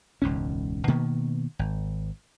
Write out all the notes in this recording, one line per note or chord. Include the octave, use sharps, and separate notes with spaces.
E1 C#2 G#2 C#4
B2 D#3 A#3 B3
G#1